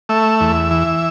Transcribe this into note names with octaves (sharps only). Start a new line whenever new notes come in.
A3 E5
E2
E3